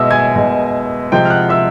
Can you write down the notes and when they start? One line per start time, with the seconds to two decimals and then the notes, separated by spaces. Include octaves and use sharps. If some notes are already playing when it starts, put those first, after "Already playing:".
Already playing: B2 G#3 D#5 E5 E6
0.11 G#5 G#6
0.36 B2 G#3
1.12 C3 F3 G#3 G5 G6
1.25 F6
1.30 F#5 F#6
1.49 E5 E6